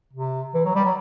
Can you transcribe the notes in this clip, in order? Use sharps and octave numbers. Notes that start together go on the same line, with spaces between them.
C3
E3
F#3
G3
F#3